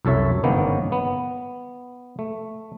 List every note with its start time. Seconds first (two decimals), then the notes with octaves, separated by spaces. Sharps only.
0.05 C2 F#2 A4 C#5 E5
0.44 G1 G#2 D#3 A#3 B3 C#4
0.92 B3
2.19 A3